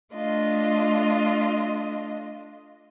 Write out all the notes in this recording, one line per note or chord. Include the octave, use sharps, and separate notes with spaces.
A3 D4 F4 D#5